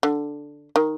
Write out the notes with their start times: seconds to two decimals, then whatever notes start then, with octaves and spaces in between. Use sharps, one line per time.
0.03 D3
0.76 D#3